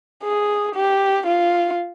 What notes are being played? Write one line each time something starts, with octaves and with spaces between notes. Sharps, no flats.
G#4
G4
F4